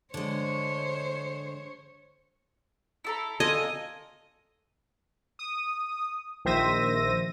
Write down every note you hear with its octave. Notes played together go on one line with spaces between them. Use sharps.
D3 G#3 C5 C#5
E4 A4 A#5
F4 A4 A#4 D#5 G#5
D#6
A#1 D#3 C5 E5 A#6 D#7